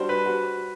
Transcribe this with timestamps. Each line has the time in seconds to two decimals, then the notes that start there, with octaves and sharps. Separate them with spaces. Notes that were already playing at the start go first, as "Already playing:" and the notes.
Already playing: G3 D4 F#4 C5
0.09 B4
0.26 F#4